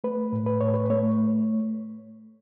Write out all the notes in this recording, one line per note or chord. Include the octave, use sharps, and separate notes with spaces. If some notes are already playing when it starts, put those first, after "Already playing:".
A3 B4
A2
B4
A2 C#5
B4
A3 C#5